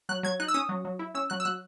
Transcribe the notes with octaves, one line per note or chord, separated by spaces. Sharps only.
F#3 F#6
F#3 G#6
D#4 F#6
E6
C#4 D#6
F#3
F#3
E4
C#4 E6
F#3 F#6
E6
F#3 F#6